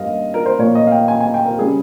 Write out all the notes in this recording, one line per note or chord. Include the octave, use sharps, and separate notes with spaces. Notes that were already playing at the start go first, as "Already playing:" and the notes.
Already playing: G2 G3 A#3 D#5 F5
A#4
C5
A#2 F3 A#3 C#5
D#5
F5
G5
G#5
G#5
G5
A#4
C#3 G3 G#4